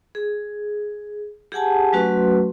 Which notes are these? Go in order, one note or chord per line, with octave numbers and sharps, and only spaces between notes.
G#4
G4 G#4 F#5 G#5 A5
F#3 A3 C#4 F#4 B4 C6